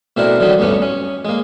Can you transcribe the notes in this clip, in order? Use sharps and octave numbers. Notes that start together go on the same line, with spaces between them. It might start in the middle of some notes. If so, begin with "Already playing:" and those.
B2 A3 C4 D4 E4 A#4
D3 D#3 F#3 G3 C4 D#4
D2 G2 A3 B3 C#4
C#4
G#3 A#3